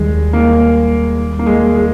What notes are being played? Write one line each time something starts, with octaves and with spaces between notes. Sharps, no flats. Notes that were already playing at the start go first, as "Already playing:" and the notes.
Already playing: D#2 D#3 G3 G#3
A#3
A#3
G#3
G#3